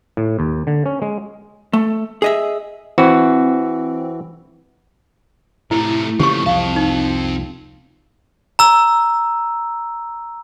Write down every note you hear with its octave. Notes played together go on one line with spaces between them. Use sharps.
A2
D#2
D3
C#4
G#3
A3
G#4 D#5 E5
E3 C4 F#4
A2 C3 A3 E4
C#3 E3 F3 A3 A#3 G4 C#6
C2 F2 C4 F5 A5
D#4
A#5 E6